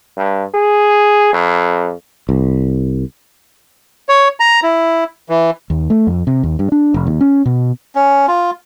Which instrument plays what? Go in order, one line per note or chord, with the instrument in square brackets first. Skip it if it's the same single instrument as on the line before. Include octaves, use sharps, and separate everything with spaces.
[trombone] G2
G#4
F2
[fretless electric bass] C2
[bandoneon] C#5
A#5
E4
E3
[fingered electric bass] D#2
A3
F2
C3
D#2
G2
D4
F1
D#2
C#4
B2
[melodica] C#4
F4